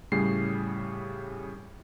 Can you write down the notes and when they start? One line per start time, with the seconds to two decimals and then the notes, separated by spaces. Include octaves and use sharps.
0.12 A2 C#3 G3 G#4 C7